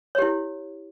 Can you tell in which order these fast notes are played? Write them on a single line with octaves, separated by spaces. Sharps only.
C#5 G4 E4